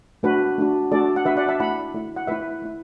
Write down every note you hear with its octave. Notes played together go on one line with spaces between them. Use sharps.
A3 D4 F#4 B4
A3 D4 F#4
A3 D4 F#4 A4 D5
F#5
A3 D4 F#4 B4 E5
D5 F#5
E5 A5
A3 E4 F#5 B5
A3 E4
F#5
A3 E4 B4 E5
A3 E4